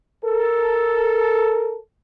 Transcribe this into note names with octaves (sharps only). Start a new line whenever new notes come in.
A4 A#4